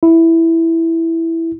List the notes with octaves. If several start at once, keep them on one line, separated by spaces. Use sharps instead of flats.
E4